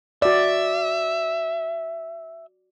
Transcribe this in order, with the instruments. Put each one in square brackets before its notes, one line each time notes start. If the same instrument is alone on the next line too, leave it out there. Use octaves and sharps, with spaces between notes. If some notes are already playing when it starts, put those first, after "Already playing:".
[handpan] F#4 D5 [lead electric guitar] E5